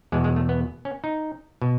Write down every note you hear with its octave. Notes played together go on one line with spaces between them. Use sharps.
E2 B2 G#3
G#3
A3
B3
C#4
D#4
B2